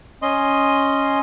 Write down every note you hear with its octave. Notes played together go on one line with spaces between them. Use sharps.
C#4 D#5 C6